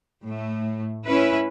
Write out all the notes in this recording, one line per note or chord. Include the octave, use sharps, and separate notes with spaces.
A2 A3
C#4 E4 B4